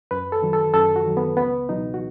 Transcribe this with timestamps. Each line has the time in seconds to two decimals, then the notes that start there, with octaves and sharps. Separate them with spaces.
0.11 F#2 B4
0.32 A4
0.43 D#3 F#3
0.53 A4
0.74 F#2 A4
0.96 F#4
1.06 D#3 F#3
1.17 B3
1.37 C#2 B3
1.69 B2 F#3 D#4
1.94 F#4